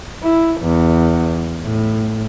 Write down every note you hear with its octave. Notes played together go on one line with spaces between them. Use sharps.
E4
E2
A2